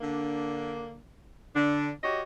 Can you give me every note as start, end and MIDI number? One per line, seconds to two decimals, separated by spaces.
0.01 0.98 50
0.01 0.98 58
0.01 0.98 62
1.55 1.90 50
1.55 1.90 62
2.04 2.22 66
2.04 2.22 67
2.04 2.22 73
2.04 2.22 75